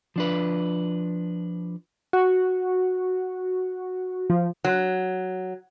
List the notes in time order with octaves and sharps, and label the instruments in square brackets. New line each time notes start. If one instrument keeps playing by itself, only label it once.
[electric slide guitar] F3 D4 B4
[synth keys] F#4
F3
[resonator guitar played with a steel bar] F#3